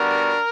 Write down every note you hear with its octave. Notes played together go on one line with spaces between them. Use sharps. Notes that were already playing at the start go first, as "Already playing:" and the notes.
Already playing: G3 B3 D4 F#4 A#4